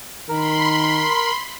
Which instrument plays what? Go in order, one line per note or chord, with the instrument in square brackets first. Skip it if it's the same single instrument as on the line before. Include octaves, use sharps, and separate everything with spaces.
[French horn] D#3 [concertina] A#4 [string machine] B5 C6